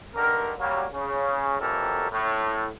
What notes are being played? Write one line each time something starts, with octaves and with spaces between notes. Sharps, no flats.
G2 D3 D#3 A#4
F#3 G3 A#3
C#3
F2 E3 F#3 G4 A4 A#4
A2